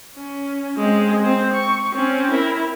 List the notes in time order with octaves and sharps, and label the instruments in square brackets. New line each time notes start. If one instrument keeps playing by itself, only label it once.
[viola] C#4
G#3 C4
C4 C5
C#6
C4 C#4
E4 A#4